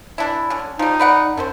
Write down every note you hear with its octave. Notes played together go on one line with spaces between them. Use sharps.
E3 D4 E4
D3 C#4
F3 G3 D#4
B4 D5 F#5
F#2 D3 C#4 C5